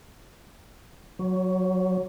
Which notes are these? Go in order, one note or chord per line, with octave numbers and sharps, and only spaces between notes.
F#3